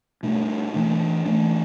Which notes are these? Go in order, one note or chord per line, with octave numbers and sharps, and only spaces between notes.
B2 A3 D4
E3 A3 D4
E3 A3 D4